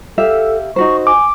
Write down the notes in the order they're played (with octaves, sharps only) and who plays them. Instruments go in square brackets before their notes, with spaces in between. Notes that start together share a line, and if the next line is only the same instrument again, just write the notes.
[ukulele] G4 E5 F5 [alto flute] A4
[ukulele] D#4 F#4 C5 [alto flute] C#6
[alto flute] G#5 [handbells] D6